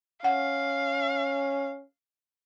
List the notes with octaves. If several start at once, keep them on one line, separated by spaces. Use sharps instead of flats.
C#4 F5 F#5